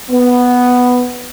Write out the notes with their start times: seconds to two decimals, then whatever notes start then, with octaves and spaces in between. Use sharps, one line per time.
0.10 B3